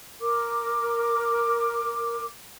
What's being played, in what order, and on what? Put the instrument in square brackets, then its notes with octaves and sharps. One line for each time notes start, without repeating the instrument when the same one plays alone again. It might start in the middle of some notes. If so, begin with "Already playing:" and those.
[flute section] A#4 D6